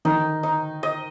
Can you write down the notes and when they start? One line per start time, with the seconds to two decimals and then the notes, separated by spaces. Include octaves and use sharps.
0.05 D#3 D#4
0.43 D#4
0.83 D#5